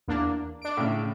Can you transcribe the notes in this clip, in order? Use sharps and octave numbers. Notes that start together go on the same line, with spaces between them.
E2 A#3 D4
D4 D7
A2 C#3